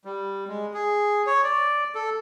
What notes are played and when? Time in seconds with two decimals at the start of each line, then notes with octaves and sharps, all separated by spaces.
0.05 G3
0.48 G#3
0.74 G#4
1.27 C#5
1.43 D5
1.95 A4